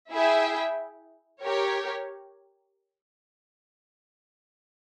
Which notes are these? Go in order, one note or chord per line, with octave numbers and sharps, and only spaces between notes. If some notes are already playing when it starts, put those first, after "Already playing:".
E4 G#4 E5 G5
G4 A#4 C#5